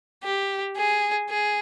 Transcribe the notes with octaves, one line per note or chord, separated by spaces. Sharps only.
G4
G#4
G#4